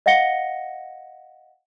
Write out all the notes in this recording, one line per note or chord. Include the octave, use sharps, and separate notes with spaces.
D#5 F5 F#5 A#6 C#7 G7